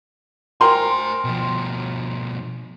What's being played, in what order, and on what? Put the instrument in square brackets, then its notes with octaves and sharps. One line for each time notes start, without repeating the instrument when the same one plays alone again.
[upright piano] A#4 G5 C6 [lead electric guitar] C5 G#5
[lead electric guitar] B2 F3